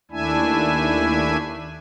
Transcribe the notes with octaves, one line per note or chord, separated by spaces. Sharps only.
D#2 A3 D4 E4 E5 G#5